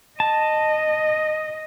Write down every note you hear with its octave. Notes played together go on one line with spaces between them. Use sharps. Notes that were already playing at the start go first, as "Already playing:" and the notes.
D#5 A5